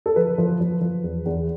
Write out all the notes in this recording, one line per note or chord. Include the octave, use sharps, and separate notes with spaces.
A4
F3 B4
F3
F3
F3
E2
E2